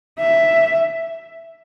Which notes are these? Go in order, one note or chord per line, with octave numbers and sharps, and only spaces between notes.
E5